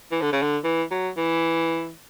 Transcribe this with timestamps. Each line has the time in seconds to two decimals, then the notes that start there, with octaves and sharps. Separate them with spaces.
0.12 E3
0.22 D3
0.33 C#3
0.42 D3
0.64 E3
0.91 F#3
1.17 E3